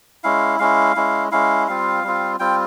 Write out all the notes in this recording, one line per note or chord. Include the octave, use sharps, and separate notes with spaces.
G#3 C#4 E4 F5
G#3 C#4 E4 F5
G#3 C#4 E4
G#3 C#4 E4 F5
G3 C4 F4 F5
G3 C4 F4
G3 C4 F4 G5